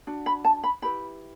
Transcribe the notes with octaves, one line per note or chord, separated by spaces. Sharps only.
D4 F#4
B5
A5
B5
E4 G4 B4 B5